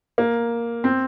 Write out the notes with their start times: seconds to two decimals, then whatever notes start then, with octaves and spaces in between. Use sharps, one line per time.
0.18 A#3
0.84 C4